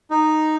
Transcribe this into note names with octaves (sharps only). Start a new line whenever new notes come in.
D#4